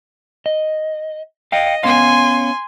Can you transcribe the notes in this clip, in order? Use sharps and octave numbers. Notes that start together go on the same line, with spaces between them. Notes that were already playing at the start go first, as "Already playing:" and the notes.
D#5
D#5 F5 G5
B3 C#4 F5 G#5 C6